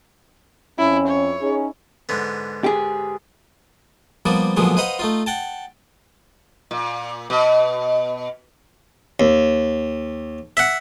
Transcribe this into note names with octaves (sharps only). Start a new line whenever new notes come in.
F2 C#4 E4
C#5
C#4 D#4 G#4
G#2 D3 B3
G4 G#4
F3 G3 A#3 B3 D5
A#2 D3 F3 F#3 G#3 B3
B4 C5 D#5 F5 F#5 A#5
A3 D#4 F4
F#5 G5 A5
A#2
B2
D#2
E5 F#5